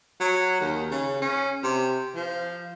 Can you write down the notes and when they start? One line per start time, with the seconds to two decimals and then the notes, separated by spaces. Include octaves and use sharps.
0.20 F#3
0.60 D#2
0.91 C#3
1.21 C#4
1.63 C3
2.15 F3